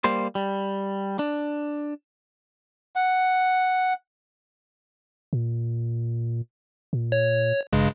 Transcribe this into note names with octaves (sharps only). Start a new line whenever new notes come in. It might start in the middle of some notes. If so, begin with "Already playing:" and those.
G3 A#3 C5
G3
D4
F#5
A#2
A#2
C#5
G#1 G2 C#3 G#3